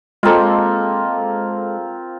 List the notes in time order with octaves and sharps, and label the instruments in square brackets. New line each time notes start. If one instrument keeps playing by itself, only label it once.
[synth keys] G#3 A4 [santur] A#3 C4 F4